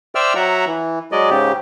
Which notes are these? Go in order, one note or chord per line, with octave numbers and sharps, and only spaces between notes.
C5 D5 E5 G5 E6 F6
F#3 E5 F#5 A#5
E3
F#3 G#3 D5 D#5
G#2 C#3 G4